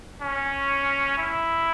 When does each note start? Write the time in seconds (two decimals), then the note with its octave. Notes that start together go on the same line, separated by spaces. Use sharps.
0.21 C#4
1.18 E4